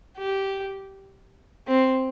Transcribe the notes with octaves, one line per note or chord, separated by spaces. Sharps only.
G4
C4